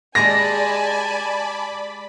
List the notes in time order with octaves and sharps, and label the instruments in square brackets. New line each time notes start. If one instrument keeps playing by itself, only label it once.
[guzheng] G#3 G4 [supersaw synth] D5 B5 [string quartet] G#5 A5 [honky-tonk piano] A#6